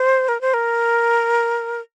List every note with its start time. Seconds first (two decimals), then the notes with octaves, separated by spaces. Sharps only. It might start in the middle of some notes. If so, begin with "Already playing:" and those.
Already playing: C5
0.28 A#4
0.41 C5
0.54 A#4